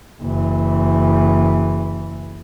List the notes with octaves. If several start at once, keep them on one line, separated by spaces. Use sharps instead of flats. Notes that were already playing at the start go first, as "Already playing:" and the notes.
F#1 E3